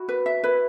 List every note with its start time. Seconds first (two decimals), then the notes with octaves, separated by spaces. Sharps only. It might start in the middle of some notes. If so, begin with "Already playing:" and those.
Already playing: E4 F#4
0.09 B4
0.26 E5
0.44 E4 B4